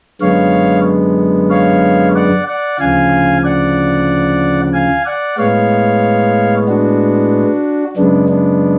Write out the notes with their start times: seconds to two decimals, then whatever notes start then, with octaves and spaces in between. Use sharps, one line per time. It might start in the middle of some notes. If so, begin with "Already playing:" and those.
0.21 F#2 D3 G#3 B3 C#5 F5
1.50 C#5 F5
2.15 D5 F#5
2.47 D5 F#5
2.79 D2 C#3 F3 F5 G#5
3.44 D5 F#5
4.73 F5 G#5
5.06 D5 F#5
5.38 A2 G#3 B3 C#5 F5
6.68 D4 F#4
7.97 F#2 C#3 G#3 B3 D4
8.29 B3 D4